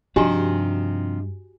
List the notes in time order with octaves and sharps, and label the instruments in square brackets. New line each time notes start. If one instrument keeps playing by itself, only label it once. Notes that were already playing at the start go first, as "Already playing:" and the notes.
[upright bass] G2 [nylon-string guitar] C3 F3 [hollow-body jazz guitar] D4 D#4 [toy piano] F#4 G4 G#5